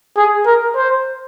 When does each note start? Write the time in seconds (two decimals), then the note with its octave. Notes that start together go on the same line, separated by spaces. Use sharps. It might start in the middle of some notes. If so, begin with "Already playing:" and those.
0.17 G#4
0.46 A#4
0.76 C5